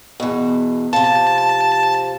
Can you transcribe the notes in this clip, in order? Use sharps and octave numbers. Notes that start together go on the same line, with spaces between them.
E2 B2
C3 F3 A5